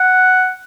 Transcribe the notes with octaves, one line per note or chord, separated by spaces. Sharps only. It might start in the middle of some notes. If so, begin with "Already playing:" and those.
Already playing: F#5